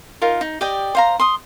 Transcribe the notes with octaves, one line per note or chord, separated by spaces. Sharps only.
D#4 F4 A#4
D#4
G4 D5 D#5 G5
C5 F5 A#5
C6 D#6